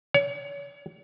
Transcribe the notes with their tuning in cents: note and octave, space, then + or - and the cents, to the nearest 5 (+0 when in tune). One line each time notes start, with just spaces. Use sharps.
C#5 +35